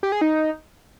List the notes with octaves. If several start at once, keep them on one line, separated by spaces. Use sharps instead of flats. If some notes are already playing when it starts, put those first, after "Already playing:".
G4
G#4
D#4